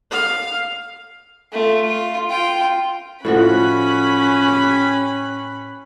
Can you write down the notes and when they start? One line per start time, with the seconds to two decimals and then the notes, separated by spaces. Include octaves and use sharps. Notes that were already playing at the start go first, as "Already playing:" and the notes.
0.11 F5
1.52 A3 F4
1.86 F4
2.29 F4 G5
3.25 A2 F3 C#4 F#4 B5 F#6
4.48 G4